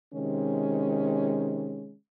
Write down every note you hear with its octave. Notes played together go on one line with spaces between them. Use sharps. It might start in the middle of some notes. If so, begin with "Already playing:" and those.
C3 D#3 G#3 C#4